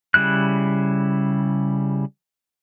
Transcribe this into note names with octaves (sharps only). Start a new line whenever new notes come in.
C#3 G3 E4 F#6